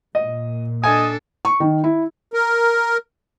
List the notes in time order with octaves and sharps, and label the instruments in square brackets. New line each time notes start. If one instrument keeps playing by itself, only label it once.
[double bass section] A#2 [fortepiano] D#5
[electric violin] D4 A4 [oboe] D#5 [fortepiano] G#5
[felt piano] C#6
D#3
E4
[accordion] A#4